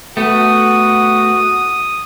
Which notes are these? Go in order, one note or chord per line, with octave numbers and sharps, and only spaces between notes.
A3 B3 F#4 D#6